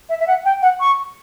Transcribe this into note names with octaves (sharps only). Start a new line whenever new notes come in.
E5
E5
F#5
G5
F#5
C#6